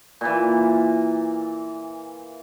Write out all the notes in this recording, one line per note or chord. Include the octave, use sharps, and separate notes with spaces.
A#2 E3